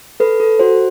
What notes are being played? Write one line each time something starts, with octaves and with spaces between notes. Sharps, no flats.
A4 B4
A4
F#4 C5